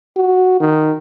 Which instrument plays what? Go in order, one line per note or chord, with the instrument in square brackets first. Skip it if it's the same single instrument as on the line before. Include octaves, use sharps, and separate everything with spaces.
[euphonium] F#4
D#3